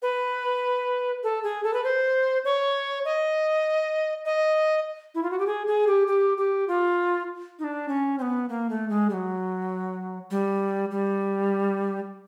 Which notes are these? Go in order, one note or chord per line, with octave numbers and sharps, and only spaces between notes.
B4
A4
G#4
A4
B4
C5
C#5
D#5
D#5
E4
F4
F#4
G4
G#4
G#4
G4
G4
G4
F4
D#4
D4
C#4
C4
B3
A#3
A3
G#3
G3
F#3
G3
G3